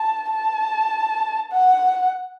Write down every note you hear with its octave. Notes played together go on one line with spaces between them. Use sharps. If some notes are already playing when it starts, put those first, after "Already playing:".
Already playing: A5
A5
F#5